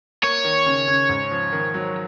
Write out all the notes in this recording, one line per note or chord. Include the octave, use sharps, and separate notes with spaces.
A#3 C#5
D#3
C#3
C#3
G#2
F3
D#3
F#3